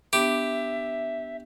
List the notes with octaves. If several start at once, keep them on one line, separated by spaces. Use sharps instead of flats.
B3 D4 G4 E5